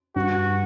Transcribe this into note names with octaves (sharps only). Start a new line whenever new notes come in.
G2 F#4